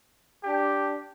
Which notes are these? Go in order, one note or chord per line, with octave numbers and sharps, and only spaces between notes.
D4 G4